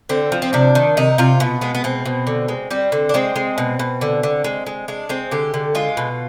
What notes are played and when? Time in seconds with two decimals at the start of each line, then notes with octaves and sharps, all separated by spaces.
0.09 D3 C4
0.32 F3
0.42 C4
0.53 C3 D4
0.75 D#3
0.97 C3 D#4
1.18 C3 F4
1.40 B2 B3
1.61 G#3 B3
1.75 B3
1.84 B2 C4
2.05 B2
2.27 D3
2.48 G#3
2.71 G3 C4
2.92 D3
3.09 D4
3.14 G#3 C4
3.36 G#3
3.58 B2
3.79 B2
4.01 D3
4.23 D3
4.44 G#3
4.66 G#3
4.88 G#3 D4
5.09 G#3 C4
5.31 D3 G4
5.54 D3
5.75 G#3 F4
5.97 B2